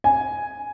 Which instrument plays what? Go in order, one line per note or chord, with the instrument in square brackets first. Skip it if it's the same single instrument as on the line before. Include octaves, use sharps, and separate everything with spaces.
[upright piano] G#5